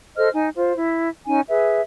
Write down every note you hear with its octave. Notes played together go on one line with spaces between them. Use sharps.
A4 C5 D#5 F6
D#4 G#5
F4 C5
E4
C#4 D#4 G#5
G#4 B4 E5